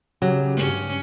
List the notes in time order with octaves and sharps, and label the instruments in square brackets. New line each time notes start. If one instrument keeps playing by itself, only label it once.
[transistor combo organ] C#3 G4 [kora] F#3
[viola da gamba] G2 C#4